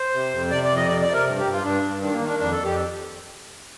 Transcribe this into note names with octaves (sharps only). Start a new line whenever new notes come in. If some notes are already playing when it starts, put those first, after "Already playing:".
Already playing: C5
C3
F2
C3 D5
D5
F2
D#5
C3 D5
D5
C3
A#4
G2
G4
G2
F4
G2 D4
G2
D#3 D4
A#3
D#3
D4
F2 D4
A4
F2
G4